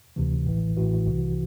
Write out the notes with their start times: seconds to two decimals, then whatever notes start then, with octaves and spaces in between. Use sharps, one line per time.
0.16 D2 C3 E3
0.47 A1 A2 E3
0.77 A1 A2 E3 F#4
1.06 C2 C3 E3